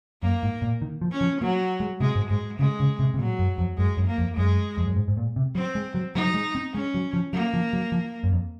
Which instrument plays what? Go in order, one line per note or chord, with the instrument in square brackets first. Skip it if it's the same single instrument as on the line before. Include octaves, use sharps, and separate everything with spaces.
[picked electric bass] F#2 [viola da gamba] A#3
[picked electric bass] G#2
A#2
D#3
F3
[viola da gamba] C#4
[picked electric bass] F3
[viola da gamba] F#3 [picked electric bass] A#3
[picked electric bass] G#3
[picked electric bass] C3 [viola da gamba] G#3
[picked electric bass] G#2
[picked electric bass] G#2 [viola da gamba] G#3
[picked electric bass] C#3 [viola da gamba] G#3
[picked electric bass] C#3
C3
C3
[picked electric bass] A#2 [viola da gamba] F#3
[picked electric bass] F#2
F2
[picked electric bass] F#2 [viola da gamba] G#3
[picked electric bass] F#2
[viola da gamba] A#3
[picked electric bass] F2
[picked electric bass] F#2 [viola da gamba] G#3
[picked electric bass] F2
F#2
G#2
G#2
A#2
C3
[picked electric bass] F#3 [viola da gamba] C4
[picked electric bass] G#3
F#3
[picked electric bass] F#3 [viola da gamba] D#4
[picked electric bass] F#3
G#3
C4
[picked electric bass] G#3 [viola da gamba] C#4
[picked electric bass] F#3
F3
[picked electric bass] F#3 [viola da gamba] A#3
[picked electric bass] F3
F#3
F3
F#2
F2